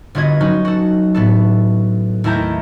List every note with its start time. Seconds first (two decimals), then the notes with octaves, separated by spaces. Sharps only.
0.15 G1 B3 F4 F#4 D#5 G#6
0.40 F#3 C#4 D#4 F#4
0.65 F#4 A4
1.14 A2 B3 A4
2.24 D#2 A3 E4 A#4 A#5 G6